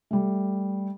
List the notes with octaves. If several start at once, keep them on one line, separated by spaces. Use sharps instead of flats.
G3 A3